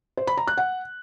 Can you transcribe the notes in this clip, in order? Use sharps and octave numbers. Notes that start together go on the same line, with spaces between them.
C5
B5
A#5
F#6
F#5